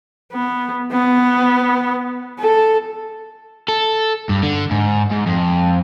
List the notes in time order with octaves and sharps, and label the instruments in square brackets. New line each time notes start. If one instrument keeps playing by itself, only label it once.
[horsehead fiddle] B3
B3
A4
[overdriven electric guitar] A4
G2
D3
G#2
G#2
F2